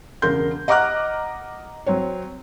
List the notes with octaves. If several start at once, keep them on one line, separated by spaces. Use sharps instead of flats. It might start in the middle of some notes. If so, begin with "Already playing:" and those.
E1 C#3 A#4 C6 G6
D#5 F#5 A#5 D6 F6 F#6
F#3 C4 C#5